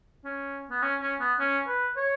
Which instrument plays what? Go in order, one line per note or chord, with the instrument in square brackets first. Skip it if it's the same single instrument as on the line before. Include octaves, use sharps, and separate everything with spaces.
[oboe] C#4
B3
C#4
C#4
B3
C#4
B4
C#5